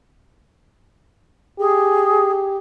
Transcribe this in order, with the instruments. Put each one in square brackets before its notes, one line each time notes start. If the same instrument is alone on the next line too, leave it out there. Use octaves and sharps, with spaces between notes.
[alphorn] G4 [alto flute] G#4